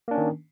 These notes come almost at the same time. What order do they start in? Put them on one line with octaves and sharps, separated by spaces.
A#3 D4 C#4 D#3